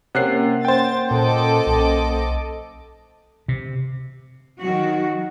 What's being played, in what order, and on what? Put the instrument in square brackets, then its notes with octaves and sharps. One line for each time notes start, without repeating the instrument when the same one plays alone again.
[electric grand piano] C3 F#6 C7 [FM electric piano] A#3 C#4 F#5
[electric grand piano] C5 G5 [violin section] A6
[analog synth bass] A#2 [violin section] A4 D#5 D6
[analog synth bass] B1
[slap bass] C3
[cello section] D#3 F#4 [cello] F#3